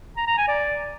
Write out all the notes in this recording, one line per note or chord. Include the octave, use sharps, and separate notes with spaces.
A#5
A#5
G#5
D5